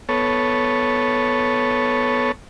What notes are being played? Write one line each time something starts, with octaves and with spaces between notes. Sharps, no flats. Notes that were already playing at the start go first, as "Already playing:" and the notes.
B3 A4 C#5